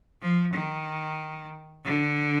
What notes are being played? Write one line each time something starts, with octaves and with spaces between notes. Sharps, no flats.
F3
D#3
D3